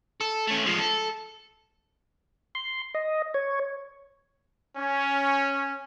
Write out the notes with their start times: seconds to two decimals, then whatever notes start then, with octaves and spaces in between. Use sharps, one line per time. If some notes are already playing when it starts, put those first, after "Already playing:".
0.21 A4
0.47 A3 C#4
0.66 F3 G#3
0.79 A4
2.55 C6
2.94 D#5
3.34 C#5
4.77 C#4